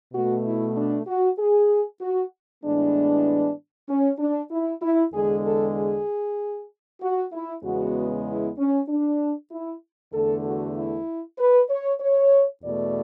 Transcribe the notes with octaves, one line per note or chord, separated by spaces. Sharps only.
B2 A3 F#4
E4
D4
F#4
G#4
F#4
A2 E3 G#3 B3 D4
C#4
D4
E4
E4
E2 D3 G#3 G#4
A4
G#4
F#4
E4
E2 C#3 G#3 B3 F#4
E4
C#4
D4
E4
E2 D3 A3 A4
F#4
E4
B4
C#5
C#5
E2 B2 A3 D5